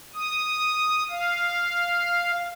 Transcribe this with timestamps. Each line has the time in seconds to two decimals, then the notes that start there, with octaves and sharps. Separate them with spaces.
0.14 D#6
1.10 F5